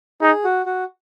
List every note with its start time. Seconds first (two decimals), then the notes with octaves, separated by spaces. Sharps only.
0.21 D#4 G#4
0.44 F#4
0.66 F#4